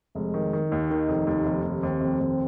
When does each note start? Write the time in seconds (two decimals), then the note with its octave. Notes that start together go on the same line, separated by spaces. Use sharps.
0.15 F1 G#3
0.34 D#3
0.53 D#3
0.71 D#2 D#4
0.90 D#3
1.08 F1
1.27 D#2
1.46 F1
1.64 D#2
1.82 D#2 C4
2.01 F1
2.19 D#2